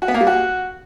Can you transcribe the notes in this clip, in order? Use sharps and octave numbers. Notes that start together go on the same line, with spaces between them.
F#4
B3
A#3
G3
F#4